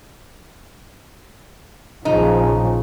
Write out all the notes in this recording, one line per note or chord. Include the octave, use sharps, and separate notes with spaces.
A#1 C#3 F3 D#4